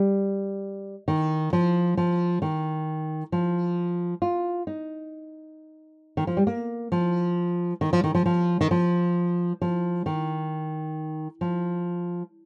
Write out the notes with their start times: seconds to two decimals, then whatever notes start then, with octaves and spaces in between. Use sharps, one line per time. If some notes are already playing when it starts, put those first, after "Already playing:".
Already playing: G3
1.08 D#3
1.53 F3
1.97 F3
2.42 D#3
3.32 F3
4.22 F4
4.67 D#4
6.17 D#3
6.27 F3
6.37 G3
6.47 A#3
6.92 F3
7.81 D#3
7.93 F3
8.04 D#3
8.15 F3
8.26 F3
8.61 D#3
8.71 F3
9.61 F3
10.06 D#3
11.41 F3